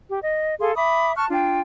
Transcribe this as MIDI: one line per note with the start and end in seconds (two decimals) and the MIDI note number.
0.10 0.19 67
0.24 0.55 75
0.59 0.72 68
0.59 0.72 69
0.59 0.72 77
0.59 0.72 84
0.76 1.12 76
0.76 1.12 83
0.76 1.12 86
0.76 1.12 87
1.16 1.25 81
1.16 1.25 85
1.16 1.25 89
1.16 1.25 90
1.30 1.60 62
1.30 1.60 65
1.30 1.60 79